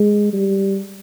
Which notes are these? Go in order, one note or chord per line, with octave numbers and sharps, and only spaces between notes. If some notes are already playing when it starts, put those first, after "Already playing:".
Already playing: G#3
G3